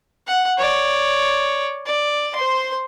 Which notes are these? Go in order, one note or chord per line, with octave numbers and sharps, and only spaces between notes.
F#5
C#5 D5
D5
C5 C6